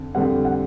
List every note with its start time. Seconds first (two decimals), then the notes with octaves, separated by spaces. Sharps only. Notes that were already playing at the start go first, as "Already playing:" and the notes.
Already playing: F2 D3
0.15 F2 D3 G3 C4 F#5
0.45 F#5